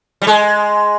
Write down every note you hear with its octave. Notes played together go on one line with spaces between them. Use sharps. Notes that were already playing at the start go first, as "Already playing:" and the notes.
G3
G#3